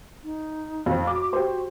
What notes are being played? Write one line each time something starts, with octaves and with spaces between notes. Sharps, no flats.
D#4
F2 C4
F#4 D6
G4 C5